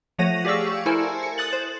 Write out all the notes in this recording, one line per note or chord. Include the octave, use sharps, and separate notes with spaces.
F3 A3 C#5 F#5 A#6 D#7
G4 G#4 D5 F5 C#6 E6
E4 A4 A#4 C5 G#5
C#7
D#6 F#6 A6 F#7
C5